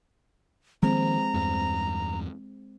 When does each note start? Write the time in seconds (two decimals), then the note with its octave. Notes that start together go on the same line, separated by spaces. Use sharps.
0.83 D#3 F3 G#3 A#3 C4 A#5
1.34 E2 G2